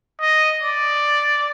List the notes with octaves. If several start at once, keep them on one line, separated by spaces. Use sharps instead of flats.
D#5
D5